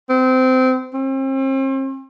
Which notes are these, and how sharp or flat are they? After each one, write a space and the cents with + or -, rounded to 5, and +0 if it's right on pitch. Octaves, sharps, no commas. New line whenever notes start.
C4 -20
C4 +40